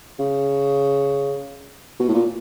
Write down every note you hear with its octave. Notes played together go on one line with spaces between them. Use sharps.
C#3
B2
A2
A#2